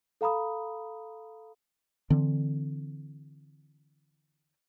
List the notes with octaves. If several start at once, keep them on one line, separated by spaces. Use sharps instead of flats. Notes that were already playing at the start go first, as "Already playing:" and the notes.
A4 F5 A#5 B5 D#6
D3 E3 C4